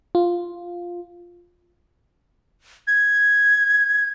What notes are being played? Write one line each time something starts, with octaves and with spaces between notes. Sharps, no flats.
F4
G#6